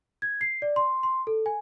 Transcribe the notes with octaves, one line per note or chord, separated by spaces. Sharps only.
G#6
C7
D5
C6
C6
A4
G#5